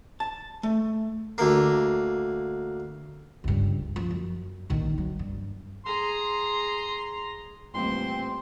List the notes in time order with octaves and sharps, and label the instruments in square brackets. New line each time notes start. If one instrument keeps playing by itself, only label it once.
[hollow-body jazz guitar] A5
A3
[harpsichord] D2 A#3
[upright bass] C#2 G2
F3
F#2
A#1 D#3
F#3
G2
[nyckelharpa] G#4 A#5 [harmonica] C6
[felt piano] D#1 A1 A#2 [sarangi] C4 [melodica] C6